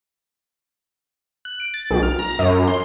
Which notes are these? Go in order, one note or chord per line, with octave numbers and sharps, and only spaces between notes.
F#6
D7
A6
B1
F6
A#5
F#2
C6